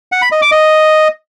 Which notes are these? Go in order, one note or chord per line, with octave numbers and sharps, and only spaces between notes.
F#5
B5
D#5
D6
D#5